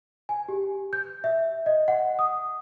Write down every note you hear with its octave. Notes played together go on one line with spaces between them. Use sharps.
G#5
G4
G6
E5
D#5
F#5
D#6